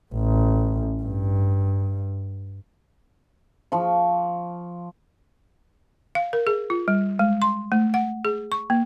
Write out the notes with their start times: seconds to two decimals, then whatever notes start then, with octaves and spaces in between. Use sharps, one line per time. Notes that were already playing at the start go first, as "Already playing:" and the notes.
0.13 A1
1.03 G2
3.72 F3 C#6
6.15 F5
6.33 A#4
6.47 G#4
6.70 F4
6.88 G3
7.19 G#3
7.42 C6
7.72 A3
7.94 F#5
8.25 G#4
8.52 C#6
8.70 A#3